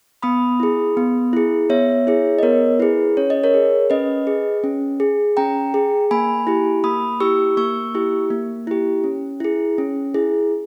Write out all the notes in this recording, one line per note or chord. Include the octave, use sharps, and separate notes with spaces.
B3 B5 D#6
E4 G#4
B3
E4 G#4
B3 C#5 E5
E4 G#4
D#5
B3 A#4 C#5
E4 G#4 B4
C#4 C#5
D#5
A#4 C#5
G#4
C#4 B4 D#5
G#4
C#4
G#4
C#4 G5 A#5
G#4
A#3 G#5 B5
E4 G4
A#3 B5 D#6
E4 G4 C#6 E6
A#3 C#6 E6
E4 G4
A#3
E4 G4
C#4
E4 G#4
C#4
E4 G#4